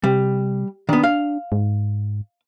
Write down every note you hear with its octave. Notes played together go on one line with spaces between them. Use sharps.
C3 G3
D#3 B3 D4
F5
G#2